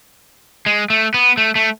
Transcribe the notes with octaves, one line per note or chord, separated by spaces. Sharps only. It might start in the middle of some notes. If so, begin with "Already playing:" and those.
G#3
A3
B3
A3
A3